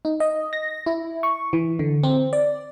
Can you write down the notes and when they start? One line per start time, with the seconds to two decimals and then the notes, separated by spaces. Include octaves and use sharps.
0.05 D#4
0.20 D#5
0.53 A#6
0.86 E4
1.23 C#6
1.53 E3
1.79 D3
2.03 C4
2.33 D5